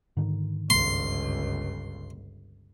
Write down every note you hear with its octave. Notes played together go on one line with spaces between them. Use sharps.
G#2 D3 D#3
G1 C#2 C6